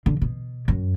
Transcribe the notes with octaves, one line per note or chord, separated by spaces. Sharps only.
D3
B2
F#2